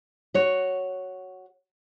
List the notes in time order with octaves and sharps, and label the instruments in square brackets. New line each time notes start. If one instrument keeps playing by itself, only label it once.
[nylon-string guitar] F#4 C#5